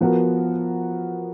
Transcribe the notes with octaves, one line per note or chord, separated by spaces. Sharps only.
F3 B3 F#4 A#4